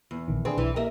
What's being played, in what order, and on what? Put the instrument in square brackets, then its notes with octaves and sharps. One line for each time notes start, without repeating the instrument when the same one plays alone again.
[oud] E2
[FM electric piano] A#1 D#3
[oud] C4 [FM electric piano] D4 G#4 B4
[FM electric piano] B1 [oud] E3
[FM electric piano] A#3 G4 [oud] A#4 D#5 E5